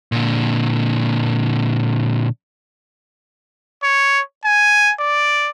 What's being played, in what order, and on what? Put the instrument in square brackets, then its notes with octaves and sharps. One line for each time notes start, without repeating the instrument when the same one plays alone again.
[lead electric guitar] A#2 D3
[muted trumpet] C#5
G#5
D5